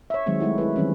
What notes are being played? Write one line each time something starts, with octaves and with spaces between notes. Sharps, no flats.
C#5 E5
D#3 F#3 G#3 C4
G#3 A3 E4 F#4
E4 G#4 B4
D#3 E3 F#3 G3 C4 C#4